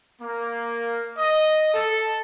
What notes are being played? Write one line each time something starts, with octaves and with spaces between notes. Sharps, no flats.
A#3
D#5
A4